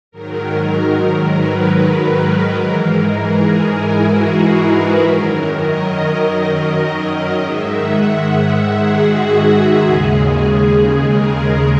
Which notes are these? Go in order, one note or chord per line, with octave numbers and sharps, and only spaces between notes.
G#2 D#3 F#3 A#4
A#4
A#4
B4
A#4
G#2 E3 G#3
G#4
E4
F#4
A#4
B4
F#2 D#3 F#3 A#4
D#5
G#2 D#3 G#3 E5
F#5
F#5
E5
G#4
F#4
G#4
D#2 C#3 G#3
A#4